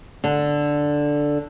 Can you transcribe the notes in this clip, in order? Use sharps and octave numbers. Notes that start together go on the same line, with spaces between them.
D3